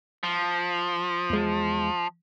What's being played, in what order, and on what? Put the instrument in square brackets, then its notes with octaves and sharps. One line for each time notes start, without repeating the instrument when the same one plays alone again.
[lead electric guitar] F3
[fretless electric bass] E2 G#3